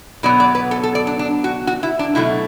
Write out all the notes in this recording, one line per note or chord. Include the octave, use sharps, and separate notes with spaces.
B2 F#3 B3 D5
D5
B4
A4
A4
D5
D4
D4
F#4
F#4
E4
D4
B2 F#3 A3 E4